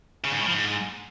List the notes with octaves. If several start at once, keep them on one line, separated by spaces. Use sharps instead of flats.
C#3
G#2
A2
F3
G#2